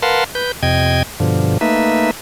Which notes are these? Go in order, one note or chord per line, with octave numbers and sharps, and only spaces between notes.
A#4 B4 F5 F#5 A5 C6
B4 G6
F2 C3 D#5 G5 G#6
G2 B2 D3 F3
A3 A#3 D#4 B4 E5